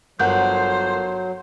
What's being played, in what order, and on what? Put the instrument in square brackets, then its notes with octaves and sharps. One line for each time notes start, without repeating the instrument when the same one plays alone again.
[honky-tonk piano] G1 A#4 F#6 [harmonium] F#3 [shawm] C5 [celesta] F#5 G6